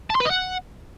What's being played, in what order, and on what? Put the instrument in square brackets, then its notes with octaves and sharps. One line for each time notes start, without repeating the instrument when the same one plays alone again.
[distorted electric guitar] A5
C6
B4
D#5
F#5